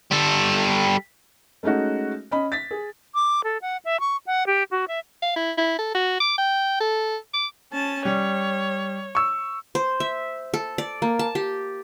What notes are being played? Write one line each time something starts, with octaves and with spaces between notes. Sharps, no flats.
G3 A4
G#3 A3 C#4 D#4 F#4
C#4 D#5 B5
A6 B6
G#4
D6
A4
F#5
E5
C#6
F#5
G4
F#4
E5
F5
E4
E4
A4
F#4
D6
G5
A4
D6
C#4 A5
G3 C#5
C#6 E6
C5
E5
A4
D5
A#3
A5
G4